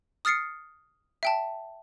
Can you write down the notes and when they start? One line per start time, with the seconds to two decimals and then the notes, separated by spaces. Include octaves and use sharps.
0.25 D#6 F6 A6 C7 C#7
1.23 E5 G5 A5